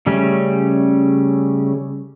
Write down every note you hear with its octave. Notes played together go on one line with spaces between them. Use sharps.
C#3 G3 A3 C#4